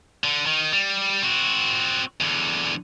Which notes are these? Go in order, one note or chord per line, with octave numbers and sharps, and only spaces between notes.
D3
D#3
G3
C4 F#4
E2 D3